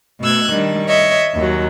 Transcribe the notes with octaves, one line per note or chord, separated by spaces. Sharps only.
B2 A3 E6 F#6 G#6
D#3 G3 D4
C#5 D#5 E5
D#2 F#3